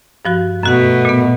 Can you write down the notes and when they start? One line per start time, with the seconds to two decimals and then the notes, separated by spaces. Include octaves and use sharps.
0.25 G2 F3 F#4
0.63 F#2 B2 A3 F#4 F#5
1.05 A#2 B3